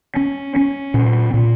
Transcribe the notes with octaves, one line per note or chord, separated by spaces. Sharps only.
C#4
C#4
A#2
A#2